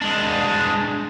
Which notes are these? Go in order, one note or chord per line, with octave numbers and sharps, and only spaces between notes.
G#3 D4